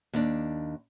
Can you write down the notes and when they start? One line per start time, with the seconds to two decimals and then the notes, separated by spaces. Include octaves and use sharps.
0.13 D#2 D4